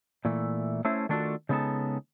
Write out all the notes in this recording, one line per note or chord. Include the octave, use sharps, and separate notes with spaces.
A#2 E3 A3
A3 C#4 E4 A4 C5
D#3 A3 D4 F4 F#4 A4
C#3 G#3 B3 D#4 A4 A5